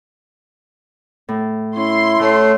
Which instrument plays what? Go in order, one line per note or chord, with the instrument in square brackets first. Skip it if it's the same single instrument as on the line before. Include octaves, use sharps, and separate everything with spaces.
[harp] A2
[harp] C#4 [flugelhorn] E4 [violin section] C6
[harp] A2 C#5 [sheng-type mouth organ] A3